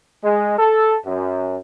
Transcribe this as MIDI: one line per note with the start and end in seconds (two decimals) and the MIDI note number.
0.24 0.56 56
0.59 0.97 69
1.06 1.57 42